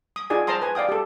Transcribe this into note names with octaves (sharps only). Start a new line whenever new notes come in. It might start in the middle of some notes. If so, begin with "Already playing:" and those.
D#6
D#4 F4 G#4 D5 G#5
C5 A5 A#5 C6 D#6
B4 G#5
D5 F5 G5 D#6
G4 A4